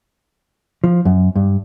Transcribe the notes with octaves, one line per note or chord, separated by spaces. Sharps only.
F3
F#2
G2